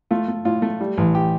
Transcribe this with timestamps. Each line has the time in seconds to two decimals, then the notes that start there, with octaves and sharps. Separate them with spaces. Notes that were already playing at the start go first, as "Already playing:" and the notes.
0.11 A3 F4
0.28 A3
0.45 A2 F4
0.62 A3
0.81 G3
0.97 A1
1.15 G4